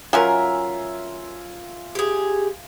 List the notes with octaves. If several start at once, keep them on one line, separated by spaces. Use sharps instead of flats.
F#3 C#4 F4 A#4 E5 G#5
G4 G#4